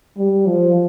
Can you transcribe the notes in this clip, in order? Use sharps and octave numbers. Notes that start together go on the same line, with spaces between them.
G3
F3